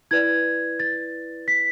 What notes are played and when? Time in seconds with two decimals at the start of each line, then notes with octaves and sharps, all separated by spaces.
0.11 E4 B4 D5 G#6
0.80 A6
1.48 B6